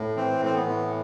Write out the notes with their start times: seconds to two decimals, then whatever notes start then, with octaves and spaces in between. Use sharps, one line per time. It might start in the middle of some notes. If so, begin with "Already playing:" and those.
Already playing: A2
0.16 E3 C4
0.42 A2 C4
0.55 B3
0.68 E3